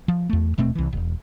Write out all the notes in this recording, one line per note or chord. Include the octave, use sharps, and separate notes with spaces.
F3
E2 A3
D#1 B2 A3 C4
C2 E3
E1